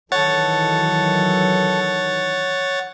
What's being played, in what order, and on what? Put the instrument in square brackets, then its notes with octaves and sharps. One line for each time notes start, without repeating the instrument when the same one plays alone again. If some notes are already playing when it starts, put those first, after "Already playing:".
[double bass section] D#3 E3 F#3 [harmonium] A4 [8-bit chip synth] C#5 F#5 A6